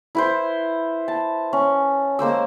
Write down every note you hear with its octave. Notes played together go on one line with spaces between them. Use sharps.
E4 B4 C5
A5
C#4
G#3 A#3 C5 E6